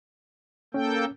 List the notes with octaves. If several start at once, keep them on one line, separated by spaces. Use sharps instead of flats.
A#3 C#4 A4 G5